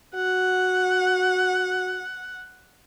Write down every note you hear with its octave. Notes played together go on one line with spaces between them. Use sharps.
F#4 F#5